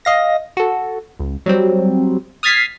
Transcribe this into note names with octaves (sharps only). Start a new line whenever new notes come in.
D#5 F5 A#6
F#4 A4
C#2
F#3 G3 C4
D#6 F6 G#6 A6 B6 C7